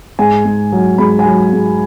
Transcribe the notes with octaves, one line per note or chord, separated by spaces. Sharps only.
G#2 G#5
G#2
F#3
G#2 B5
G#5
F#3
G#2